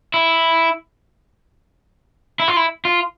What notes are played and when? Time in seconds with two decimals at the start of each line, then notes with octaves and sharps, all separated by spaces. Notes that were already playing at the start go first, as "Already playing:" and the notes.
0.14 E4
2.40 E4
2.48 F4
2.56 E4
2.85 F4